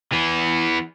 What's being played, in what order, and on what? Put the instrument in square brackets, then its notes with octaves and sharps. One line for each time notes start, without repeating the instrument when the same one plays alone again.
[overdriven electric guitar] E3 B3